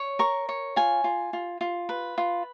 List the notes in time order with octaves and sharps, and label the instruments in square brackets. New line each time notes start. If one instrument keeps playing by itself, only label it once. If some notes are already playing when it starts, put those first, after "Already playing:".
Already playing: [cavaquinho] C#5
A#4 C#6
C#5
F4 G#5
F4
F4
F4
B4
F4